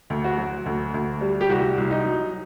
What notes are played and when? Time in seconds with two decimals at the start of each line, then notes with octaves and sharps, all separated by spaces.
0.10 D2
0.24 F#4
0.38 F#3
0.66 D2
0.94 D2
1.21 G3
1.41 G4
1.49 C2 F#4
1.78 C2
1.91 D#4
2.06 F#3